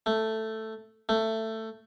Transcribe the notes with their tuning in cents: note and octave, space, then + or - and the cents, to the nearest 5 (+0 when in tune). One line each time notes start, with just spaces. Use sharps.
A3 +5
A3 +15